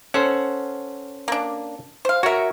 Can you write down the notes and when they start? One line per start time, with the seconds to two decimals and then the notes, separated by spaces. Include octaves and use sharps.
0.14 C#4 A4 C5 F#5
1.28 A#3 D4
2.05 C5 F5
2.23 F#4 A#4 C#5 E5